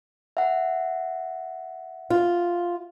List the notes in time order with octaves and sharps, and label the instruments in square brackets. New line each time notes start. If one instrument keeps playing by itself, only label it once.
[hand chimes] E5 F#5
[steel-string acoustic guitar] F4